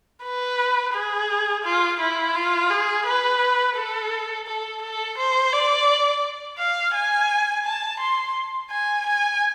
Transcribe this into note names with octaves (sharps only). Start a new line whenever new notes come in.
B4
G#4
F4
E4
F4
G#4
B4
A4
A4
A4
C5
D5
F5
G#5
A5
C6
G#5
G#5